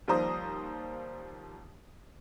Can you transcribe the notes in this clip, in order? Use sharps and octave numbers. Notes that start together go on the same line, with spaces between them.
D#2 F3 G3 C5 A#5 D#6